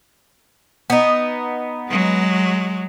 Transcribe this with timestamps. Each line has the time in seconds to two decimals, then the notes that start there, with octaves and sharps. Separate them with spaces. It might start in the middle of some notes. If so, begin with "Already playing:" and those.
0.90 B3 D#4
1.89 F#3 G#3